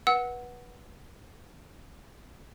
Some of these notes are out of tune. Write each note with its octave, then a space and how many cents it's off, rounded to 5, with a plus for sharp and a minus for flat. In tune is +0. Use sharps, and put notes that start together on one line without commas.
B4 -20 F#5 +0 E6 -30